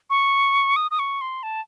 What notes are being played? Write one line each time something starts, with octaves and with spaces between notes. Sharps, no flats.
C#6
D#6
D#6
C#6
C6
A5